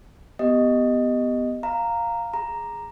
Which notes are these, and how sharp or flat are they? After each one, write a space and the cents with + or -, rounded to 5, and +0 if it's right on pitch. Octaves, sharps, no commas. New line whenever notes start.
B3 +10 G4 +5 D#5 +0
F5 +5 A#5 -10
G#4 +0 A#5 +0